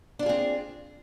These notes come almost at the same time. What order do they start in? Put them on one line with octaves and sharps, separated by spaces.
D4 F4 G#4 C4